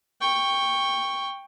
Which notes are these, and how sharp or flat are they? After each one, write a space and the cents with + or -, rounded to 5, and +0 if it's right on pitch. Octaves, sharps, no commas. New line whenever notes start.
G5 +15 C#6 +0